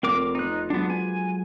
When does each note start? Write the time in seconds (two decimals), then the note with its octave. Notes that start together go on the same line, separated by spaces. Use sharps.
0.03 F1 C4 A#4 D6
0.35 B3 D#4 C6 F#6
0.70 F#3 G#3 B3 D4
0.90 G#5